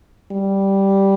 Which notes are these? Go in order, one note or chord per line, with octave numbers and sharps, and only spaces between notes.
G3